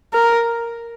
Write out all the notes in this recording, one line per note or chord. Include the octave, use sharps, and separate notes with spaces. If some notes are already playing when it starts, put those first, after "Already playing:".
A#4